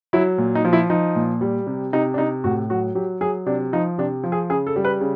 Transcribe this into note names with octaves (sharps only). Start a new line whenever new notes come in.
F#3 E4
A#2
D#4
F3
E4
F3 D#4
A#2
G3
C3
C3 D#4
D4
C3 D#4
A2 F#4
F#3 F#4
F#3 G4
F#3 G#4
C3 D4
F3 D#4
C3 D4
F3
G#4
C#3 G#4
A4
G3
B4
C#3